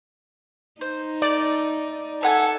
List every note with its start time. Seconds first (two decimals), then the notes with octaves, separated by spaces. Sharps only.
0.81 D#4 C5
1.22 A3 D5
2.23 A4 E5 F#5 G#5